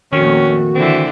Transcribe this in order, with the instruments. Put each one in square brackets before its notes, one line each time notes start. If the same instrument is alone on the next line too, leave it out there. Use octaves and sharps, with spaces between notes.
[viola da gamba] F2 A#2 A3 [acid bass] D#3 [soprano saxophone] C#4 [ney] F#4
[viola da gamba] D3 E3 [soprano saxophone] C4